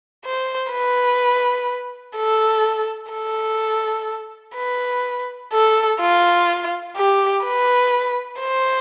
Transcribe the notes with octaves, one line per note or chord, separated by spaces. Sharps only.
C5
B4
A4
A4
B4
A4
F4
G4
B4
C5